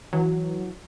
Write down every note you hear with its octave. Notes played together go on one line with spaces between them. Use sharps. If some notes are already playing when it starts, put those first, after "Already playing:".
E3 F#3